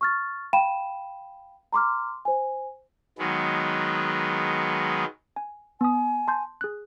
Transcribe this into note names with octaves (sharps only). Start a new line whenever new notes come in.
C#6 F6 A6
F5 G5 B5 D#7 E7
A#5 C6 D6 F6
C5 G#5
D#3 F#3 G#3 B3
G#5
B3 G#5 D#6
A5 C6 G6
G#4 F#6